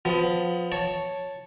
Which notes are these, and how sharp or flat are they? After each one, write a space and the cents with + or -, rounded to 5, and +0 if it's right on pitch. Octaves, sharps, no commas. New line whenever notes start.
F3 +20 B3 +30
C#5 +0 A5 +0